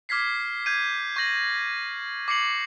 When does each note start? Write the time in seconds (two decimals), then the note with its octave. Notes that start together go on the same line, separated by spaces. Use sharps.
0.09 D6 F6 G#6 B6 C7
0.66 G6 G#6 D#7
1.16 C#6 G6 A#6 F#7
2.28 D6 C7 C#7 F#7